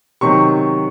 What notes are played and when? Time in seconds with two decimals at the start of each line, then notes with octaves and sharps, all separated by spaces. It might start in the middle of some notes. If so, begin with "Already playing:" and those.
0.21 C3 D#3 F#3 C#6